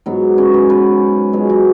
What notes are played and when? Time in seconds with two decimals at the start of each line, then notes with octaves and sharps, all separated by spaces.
0.06 G#2 F#3 B3
0.38 C#3 C#4
0.54 B3 B4
0.70 B3 B4
1.33 B2 F#3 G#3 G#4
1.49 F#3 F#4